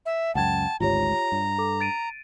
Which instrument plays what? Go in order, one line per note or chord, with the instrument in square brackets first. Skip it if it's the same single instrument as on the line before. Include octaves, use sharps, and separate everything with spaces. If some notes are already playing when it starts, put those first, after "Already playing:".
[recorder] E5
[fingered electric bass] C#2 F#2 [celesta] F#5 G5 G#6 [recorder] A5
[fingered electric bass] G#1 D2 G#2 [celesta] F4 G4 C#5 [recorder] A#5
[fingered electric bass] G2
[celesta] A4 D6
A6 D7 D#7